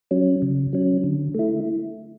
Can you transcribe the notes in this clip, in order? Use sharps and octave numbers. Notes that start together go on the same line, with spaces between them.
F#3 C#4
C#3
F#3 C#4
D3
A3 E4